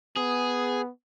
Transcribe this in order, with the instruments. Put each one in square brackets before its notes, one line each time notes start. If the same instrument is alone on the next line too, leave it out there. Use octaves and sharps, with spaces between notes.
[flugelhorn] B3 [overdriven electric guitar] G#4